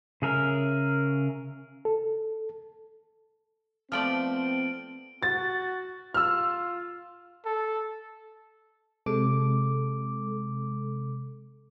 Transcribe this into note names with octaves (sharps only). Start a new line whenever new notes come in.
C#3 G#4 A#4 E5
A4
F3 A3 B3 C4 D5 F6 D7 F#7
F#4 A6
F4 E6 F6
A4
C3 G#3 A4 D6